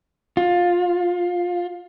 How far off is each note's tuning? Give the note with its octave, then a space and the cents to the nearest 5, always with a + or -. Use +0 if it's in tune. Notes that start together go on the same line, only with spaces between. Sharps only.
F4 +15